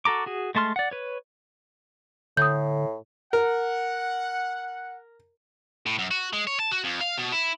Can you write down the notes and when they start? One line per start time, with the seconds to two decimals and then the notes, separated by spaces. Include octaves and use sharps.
0.05 F#4 A4 A#5 D6
0.26 F#4 G#4
0.55 G#3 A3 A5 C6 F6
0.76 D5 F#5
0.91 B4 C#5
2.37 A2 D3 D#6 G6
3.33 A#4 F#5
5.86 A2
5.99 F#2
6.11 F#4
6.33 G#3
6.47 C#5
6.60 A5
6.71 F#4
6.84 F2
7.01 F5
7.18 B2
7.32 E4